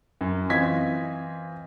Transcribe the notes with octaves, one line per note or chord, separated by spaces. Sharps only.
F#2
E3 C4 F4 D#5 G#6 B6